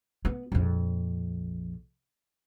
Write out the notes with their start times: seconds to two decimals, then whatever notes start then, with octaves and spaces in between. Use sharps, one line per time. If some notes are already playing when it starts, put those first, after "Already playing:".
0.25 B3
0.52 A#1 F2